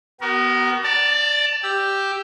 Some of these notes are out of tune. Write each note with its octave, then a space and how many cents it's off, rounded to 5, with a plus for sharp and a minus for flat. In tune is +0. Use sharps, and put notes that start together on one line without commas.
B3 +0 F#4 +45 A#4 +15
D5 +0 A5 +30
G4 +0 E6 +0